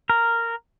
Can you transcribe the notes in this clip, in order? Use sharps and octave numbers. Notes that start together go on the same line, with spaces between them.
A#4